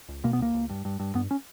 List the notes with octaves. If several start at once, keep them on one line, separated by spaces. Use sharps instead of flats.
C#2
B2 A#3
B3
C#2 A#3
C#2
G2
G2
G2
G2 B3
C#4